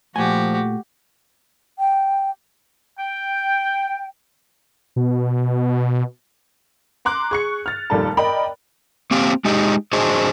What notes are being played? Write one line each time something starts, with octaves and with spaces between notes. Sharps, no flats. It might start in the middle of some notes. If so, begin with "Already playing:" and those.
A#2 F3 A3 F#4 G4 G#5
G5
G5
B2
A#5 C6 D6 F#6
G#4 C#6 C#7
F6 A6
F1 D#2 A#2 G3 A4 A5
A#4 D5 D#5 G5 B5
A#3 C4 G4 F5
G#3 D#4 G4 D#5
D4 F#4 G#4 C5 D5 D#5